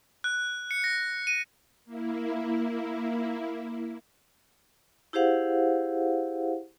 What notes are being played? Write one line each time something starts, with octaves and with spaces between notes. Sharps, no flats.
F#6
C#7
A#6
D#7
A#3 E4
E4 G4 G#4 C5 F5 F#5